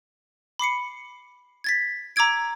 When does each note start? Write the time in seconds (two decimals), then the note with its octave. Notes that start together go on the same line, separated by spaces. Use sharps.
0.59 B5 D6 C7 C#7
1.64 G#6 A6 B6
2.16 A#5 D6 E6 G#6 D7